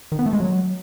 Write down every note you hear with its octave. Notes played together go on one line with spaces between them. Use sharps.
D#3
B3
A3
G#3
F#3